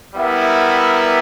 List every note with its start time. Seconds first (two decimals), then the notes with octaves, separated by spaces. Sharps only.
0.15 G3 B3 E4 A#4 E5